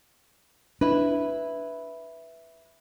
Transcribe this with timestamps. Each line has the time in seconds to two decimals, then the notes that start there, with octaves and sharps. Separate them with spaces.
0.81 D4 E4 B4